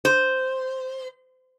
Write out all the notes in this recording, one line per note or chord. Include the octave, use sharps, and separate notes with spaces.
C5